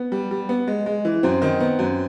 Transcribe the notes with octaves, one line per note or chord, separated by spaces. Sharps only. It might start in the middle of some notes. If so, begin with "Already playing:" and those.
Already playing: B3
G3
G3
B3
G#3
G#3
E3
F#2 C4
D#3
B3
F#2